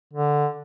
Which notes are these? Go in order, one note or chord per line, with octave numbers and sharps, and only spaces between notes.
D3